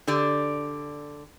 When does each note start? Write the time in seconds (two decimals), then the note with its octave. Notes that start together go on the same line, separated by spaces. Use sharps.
0.07 D3 G4 D5